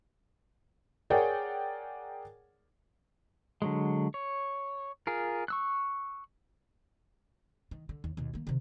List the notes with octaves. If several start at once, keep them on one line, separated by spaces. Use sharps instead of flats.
G#4 A#4 C#5 D5 F#5 G5
D3 F#3 G#3
C#5
F4 G#4 A#4
C#6 E6 F#6
D#3
D3
D#2
D#2 B2
D#3 A#3
C3 D#3